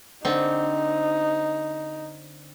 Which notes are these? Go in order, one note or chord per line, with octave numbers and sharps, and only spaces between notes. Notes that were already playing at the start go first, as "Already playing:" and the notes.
D3 C4 D#4